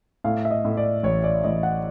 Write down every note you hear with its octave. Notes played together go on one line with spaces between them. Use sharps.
A2 F5
E5
D#5
A2
D5
A1 C#5
D5
A1 D#5
F#5